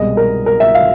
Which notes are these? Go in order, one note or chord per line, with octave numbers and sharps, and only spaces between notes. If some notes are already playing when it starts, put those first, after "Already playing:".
Already playing: C2 B2 G#3 D#5
A#4
A#4
E5
F5